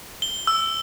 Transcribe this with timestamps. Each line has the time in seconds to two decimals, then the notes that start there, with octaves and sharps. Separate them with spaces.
0.22 G7
0.47 E6